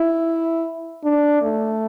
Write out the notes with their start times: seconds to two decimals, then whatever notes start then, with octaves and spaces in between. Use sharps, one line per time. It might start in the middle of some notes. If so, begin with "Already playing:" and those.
Already playing: E4
1.04 D4
1.42 A3